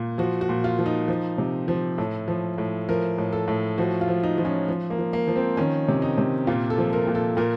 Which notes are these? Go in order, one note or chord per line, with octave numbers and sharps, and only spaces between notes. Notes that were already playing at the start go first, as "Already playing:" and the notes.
Already playing: A#2
F3 F#4
F#4
A#2
F4
F3
D#4
F3
C3
F3
A2 A4
F3
A2
F3 A#4
A2
A4
A2
F3 F#4
F4
F3
D#4
F3
C#4
F3
A#3
F3
A#3
F3
C4
D#3 C#4
C3
D#4
C3
A#2 F4
A4
F3
A#4
A#2
A4
A#2 A#4